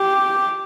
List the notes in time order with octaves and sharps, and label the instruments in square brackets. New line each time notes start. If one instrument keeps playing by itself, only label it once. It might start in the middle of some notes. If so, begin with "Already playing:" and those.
Already playing: [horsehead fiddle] G4